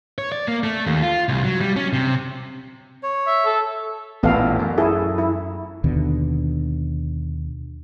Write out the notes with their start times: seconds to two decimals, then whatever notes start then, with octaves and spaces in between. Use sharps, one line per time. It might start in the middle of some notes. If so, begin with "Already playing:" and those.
0.18 C#5
0.32 D5
0.48 A#3
0.64 A3
0.86 D#2
1.02 F4
1.29 C2
1.44 F#3
1.61 G3
1.77 C#4
1.93 C3
3.03 C#5
3.27 E5
3.45 A4
4.23 A1 A#2 B3 A4 F5
4.59 F#2
4.78 E4 G#4 A4
5.18 E4
5.84 D#2 B2 D3